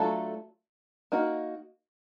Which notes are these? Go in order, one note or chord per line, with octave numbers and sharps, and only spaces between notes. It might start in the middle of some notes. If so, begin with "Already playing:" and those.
Already playing: F#3 A3 D4 F4 A4
A#3 D#4 F#4